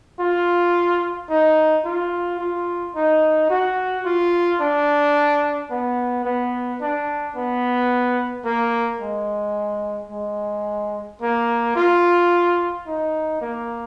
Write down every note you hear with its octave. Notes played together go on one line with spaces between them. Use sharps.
F4
D#4
F4
F4
D#4
F#4
F4
D4
B3
B3
D4
B3
A#3
G#3
G#3
A#3
F4
D#4
A#3